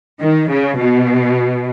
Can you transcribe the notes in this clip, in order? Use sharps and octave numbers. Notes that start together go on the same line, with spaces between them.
D#3
C#3
B2